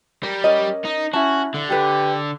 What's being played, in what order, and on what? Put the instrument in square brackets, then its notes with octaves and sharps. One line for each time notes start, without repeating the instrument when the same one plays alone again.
[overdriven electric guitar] G3 [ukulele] A#4
[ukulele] C#4 A#4 D#5
[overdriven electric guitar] D#4
[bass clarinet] C#4 [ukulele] E4 A5 [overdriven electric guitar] F#4
[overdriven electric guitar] D3
[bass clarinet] G4 [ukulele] A4 B4